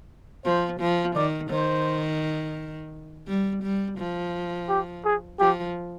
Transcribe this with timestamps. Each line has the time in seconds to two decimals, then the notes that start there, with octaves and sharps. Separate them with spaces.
0.45 F3 C5
0.80 F3
1.16 D#3 D5
1.50 D#3 C5
3.28 G3
3.63 G3
3.98 F3
4.69 G4
5.05 G#4
5.39 F3 G4